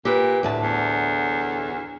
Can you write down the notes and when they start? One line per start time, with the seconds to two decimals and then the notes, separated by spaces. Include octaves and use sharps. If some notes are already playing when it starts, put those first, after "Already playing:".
0.05 A#2 G4 B4
0.43 D2 A2 A5
0.61 E2